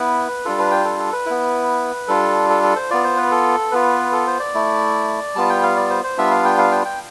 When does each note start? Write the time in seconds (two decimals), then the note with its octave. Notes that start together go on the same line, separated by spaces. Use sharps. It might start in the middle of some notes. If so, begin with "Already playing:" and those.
Already playing: B3 E4 B4
0.45 G3 D4 F4 A4
0.59 B4
0.71 G5
0.85 A4
0.99 A4
1.12 B4
1.26 B3 E4
2.08 G3 D4 F4 A4
2.50 A4
2.63 A4
2.76 C5
2.90 B3 F4 D5
3.04 C5
3.17 B4
3.31 A4
3.71 B3 F4 B4
4.12 A4
4.27 C5
4.40 D5
4.54 A3 E4
5.35 G3 B3 F4 A5
5.50 G5
5.63 F5
5.76 D5
5.90 C5
6.04 C5
6.18 G3 B3 D4 F4 E5
6.31 F5
6.45 G5
6.58 F5
6.71 G5
6.85 G5